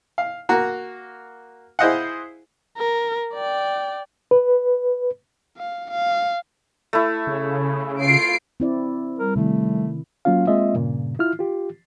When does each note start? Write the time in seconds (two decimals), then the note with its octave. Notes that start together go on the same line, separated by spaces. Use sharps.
0.18 F5
0.49 A#3 F#4 A#5
1.79 E4 G#4 C5 D#5 F5 F#5
2.77 A#4
3.34 D5 G5
4.31 B4
5.58 F5
5.91 F5
6.93 A3 E4
7.27 C#3
8.01 F4 C7 D7
8.60 C4 E4 D5
9.19 G3 A#4
9.36 C3 D#3 A3 E4
10.25 F#3 A#3 C#4 F4 F5
10.47 G#3 A#3 C4 F4 D#5 E5
10.74 G2 A#2 C#3
11.19 E4 F4 F6
11.39 F4 G4